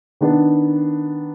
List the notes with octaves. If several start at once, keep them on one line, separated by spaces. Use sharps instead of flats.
D#3 B3 D4